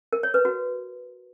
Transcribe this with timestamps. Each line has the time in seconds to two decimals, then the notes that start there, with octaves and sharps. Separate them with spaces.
0.13 A#4
0.23 C#5
0.34 B4
0.45 F#4